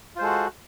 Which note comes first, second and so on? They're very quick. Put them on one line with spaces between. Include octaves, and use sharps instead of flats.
F4 C5 G#3 A4 F#4